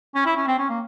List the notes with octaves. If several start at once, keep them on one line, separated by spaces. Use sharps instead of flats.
C#4
E4
C#4
C4
C#4
A#3